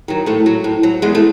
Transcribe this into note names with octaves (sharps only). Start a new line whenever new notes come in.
D#3 F#3
A2 A3
F#3
A2
F#3
E2 G#3
A3